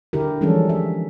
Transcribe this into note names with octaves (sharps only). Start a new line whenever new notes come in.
D3 E4 G4 A#4
E3 F3 G3 G#3 C#4 A4
E5